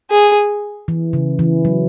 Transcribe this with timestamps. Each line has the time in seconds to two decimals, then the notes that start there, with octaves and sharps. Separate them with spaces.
0.11 G#4
0.88 E3
1.13 C#3
1.39 E3
1.65 F#3